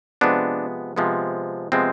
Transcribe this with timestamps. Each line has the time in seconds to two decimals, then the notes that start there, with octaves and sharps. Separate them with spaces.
0.21 C3 F3 G#3 B3 D4
0.96 C3 F3 G#3 B3
1.72 C3 F3 G#3 B3 C4